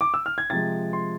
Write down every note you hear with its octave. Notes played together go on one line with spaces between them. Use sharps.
D6
E6
F6
G#6
C3 F3 G#3 A6
C6